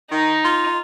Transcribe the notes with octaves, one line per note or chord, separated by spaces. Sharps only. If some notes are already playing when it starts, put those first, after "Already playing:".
D#3 D#4
F4